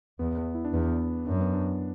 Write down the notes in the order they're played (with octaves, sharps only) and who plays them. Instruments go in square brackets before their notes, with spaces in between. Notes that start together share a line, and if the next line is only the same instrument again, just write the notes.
[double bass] E2 [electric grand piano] B3
[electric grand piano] B3
E4
D4
[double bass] E2 [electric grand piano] B3
[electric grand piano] D4
[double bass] F#2 [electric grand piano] D4
[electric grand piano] B3
D4